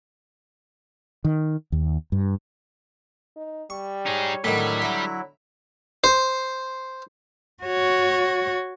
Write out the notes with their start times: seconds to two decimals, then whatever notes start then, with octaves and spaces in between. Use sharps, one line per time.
1.25 D#3
1.72 D#2
2.12 G2
3.36 D#4
3.70 G3 C#6
4.06 D#4 G#4 C#5
4.44 A2 D3 D#3 F#3 G3 E4
4.82 E5 A#5
6.04 C5
7.64 F#4 C#5